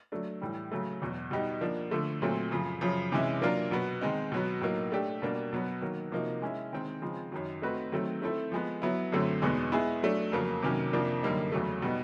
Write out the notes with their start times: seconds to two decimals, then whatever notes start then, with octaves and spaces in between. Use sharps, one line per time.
0.12 F#3 A3 D4
0.41 A2 E3 G3
0.72 C#3 F#3 A3
1.02 E2 B2 F#3
1.31 B2 G3 B3 D#4 G4
1.61 F3 A#3 D4
1.91 D3 F3 A3
2.22 A#2 F#3 A3 C4
2.51 F#2 C#3 F3
2.81 F#2 C#3 F3
3.12 C3 E3 G#3 C#4 E4
3.42 F#3 A#3 D4 F4 A#4
3.71 B2 F#3 B3
4.01 D#3 G#3 C4 D#4
4.32 B2 F#3 B3
4.61 A2 F#3 A#3 D#4
4.92 A3 D4 G4
5.22 B2 G3 A#3 D4
5.53 B2 F#3 B3
5.81 D#3 F#3 A#3
6.11 C3 F3 A#3 D#4 F#4
6.42 G#3 C#4 E4
6.73 D#3 G#3 C4
7.02 C#3 F3 G#3 C4
7.32 F#2 D#3 F#3
7.62 A3 C4 D#4 F#4 B4
7.92 D#3 F#3 A3 C4
8.22 A3 C4 E4 A4
8.52 F3 G#3 B3
8.82 F#3 B3 E4
9.12 F#2 D3 F#3 A3 C4
9.42 E2 B2 G#3 B3 D#4
9.72 G#3 B3 E4 G#4
10.03 F#3 A3 D4
10.32 F2 C#3 F#3 A#3
10.63 C3 D#3 F#3 A#3 C#4
10.93 F2 C3 F3 A#3 D4
11.23 F#2 D3 G3 A#3 D#4
11.52 E2 C#3 F#3 A3
11.82 B2 G3 B3 D#4